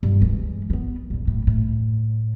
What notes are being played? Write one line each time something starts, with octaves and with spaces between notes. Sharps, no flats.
G2
E3 G#3
A#3 B3
D#1 A#1
A2
A2